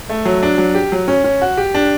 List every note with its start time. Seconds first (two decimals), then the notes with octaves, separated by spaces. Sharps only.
0.09 A3
0.25 F#3
0.43 D4
0.58 F#3
0.74 G4
0.92 F#3
1.08 C#4
1.24 C#4
1.42 F#4
1.57 G4
1.75 D4